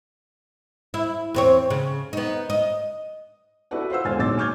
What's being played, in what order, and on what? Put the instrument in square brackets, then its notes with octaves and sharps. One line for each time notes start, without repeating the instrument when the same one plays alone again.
[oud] E4
E2 C4 C#5
C#3
B3 D#4
D#5
[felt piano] E4 F#4 A4 B4 D5 F#5
F4 C5 F#5 E6
E1 D3 C5 G#5 F6 A6
B1 A#2 D#4 D6 E6 A6
G#5 C#6 D6 F6 G6 G#6